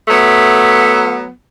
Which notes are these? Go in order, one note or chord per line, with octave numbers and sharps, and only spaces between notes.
F#3 A3 B3